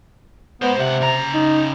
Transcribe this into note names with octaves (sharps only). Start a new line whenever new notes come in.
G#3 B3 C5
C#2 C3 F#5
C#3 A#5
D#4